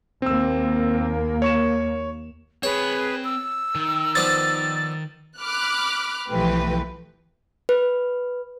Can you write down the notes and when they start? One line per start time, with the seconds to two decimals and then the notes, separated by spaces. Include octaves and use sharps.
0.22 D#2 A#3 C4 E6
1.42 C#5 C#6 E7
2.63 C4 G#4 B4 C#5 B5
3.24 E6
3.75 D#3
4.15 F3 B3 D4 A6
5.39 B5 D6 F6 F#6
6.29 B1 E3 F3 A3 G4 B4
7.69 B4